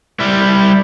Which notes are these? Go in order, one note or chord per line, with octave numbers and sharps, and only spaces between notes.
G3 E4